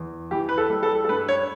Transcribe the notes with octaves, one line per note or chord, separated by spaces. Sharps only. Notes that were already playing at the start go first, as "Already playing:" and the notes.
Already playing: E2
E3 G4
B4
A4
G3
A4
A4
G2 B4
C#5